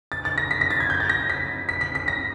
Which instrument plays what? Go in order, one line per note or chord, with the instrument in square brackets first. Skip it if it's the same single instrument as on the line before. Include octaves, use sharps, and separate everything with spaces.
[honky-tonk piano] A6
A6
A#6
B6
A#6
A6
G#6
G6
A6
A#6
B6
B6
B6
B6
A#6